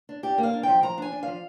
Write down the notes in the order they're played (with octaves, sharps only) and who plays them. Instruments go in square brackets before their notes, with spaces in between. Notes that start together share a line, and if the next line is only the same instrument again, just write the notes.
[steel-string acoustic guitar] D4
D4 G4
A#3
F5
D4
F3 G5
F3 A#5
D4 G#5
D4
F3 F5